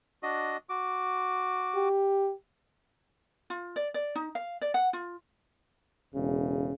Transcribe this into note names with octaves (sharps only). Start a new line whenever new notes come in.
D4 F#4 D#5
F#4 D6
G4
F4
D5
D5
D#4
F5
D5
F#5
F4
E1 C#3